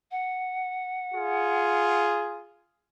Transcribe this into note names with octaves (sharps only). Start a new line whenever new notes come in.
F#5
F4 G#4